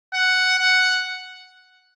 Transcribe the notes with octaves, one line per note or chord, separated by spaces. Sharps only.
F#5
F#5